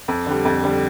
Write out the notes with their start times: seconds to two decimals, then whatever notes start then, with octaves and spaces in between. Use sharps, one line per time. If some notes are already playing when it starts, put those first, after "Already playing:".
0.08 F2
0.27 D3 G3
0.45 F2
0.63 D3 G3